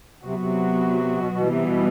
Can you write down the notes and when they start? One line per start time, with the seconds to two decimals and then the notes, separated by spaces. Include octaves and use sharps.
0.24 C3 F#3 B3 F#4
0.39 C3
1.17 B2
1.32 B2
1.47 C3 E3 G3 B3
1.62 B2